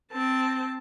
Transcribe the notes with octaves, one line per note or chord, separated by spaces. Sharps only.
C4 A5